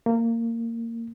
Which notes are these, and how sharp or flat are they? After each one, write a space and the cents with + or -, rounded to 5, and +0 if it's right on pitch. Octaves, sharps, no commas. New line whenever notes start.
A#3 -20